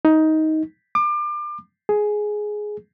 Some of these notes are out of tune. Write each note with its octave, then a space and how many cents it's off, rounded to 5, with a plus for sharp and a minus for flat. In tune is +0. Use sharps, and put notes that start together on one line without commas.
D#4 +15
D6 +30
G#4 +10